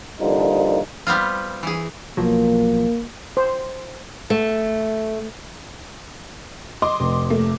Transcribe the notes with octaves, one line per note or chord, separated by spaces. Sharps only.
C2 G2 A#2 D3 F3 D#4
G3 B3 C4 F4
E3 G#4
B1 F3 F#3 A#3
C5
A3
D#5 C6 D6
F1
A3 A#3